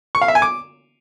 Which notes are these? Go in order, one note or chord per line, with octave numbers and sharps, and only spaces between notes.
C#6
F5
E5
G#5
D6